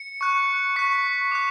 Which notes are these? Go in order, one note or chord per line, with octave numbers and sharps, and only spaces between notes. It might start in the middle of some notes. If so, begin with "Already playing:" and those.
Already playing: C#7
C#6 F#6
C#6 F#6 B6
D6 F#6